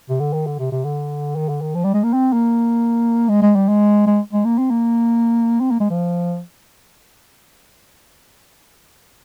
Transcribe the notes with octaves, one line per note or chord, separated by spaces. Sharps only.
C3
D3
D#3
D3
C3
C3
D3
D#3
D3
D#3
F3
G3
G#3
A#3
C4
A#3
G#3
G#3
G3
G#3
G#3
G#3
A#3
C4
A#3
C4
A#3
G#3
F3